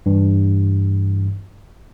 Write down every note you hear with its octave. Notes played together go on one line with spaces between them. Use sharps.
G2 E3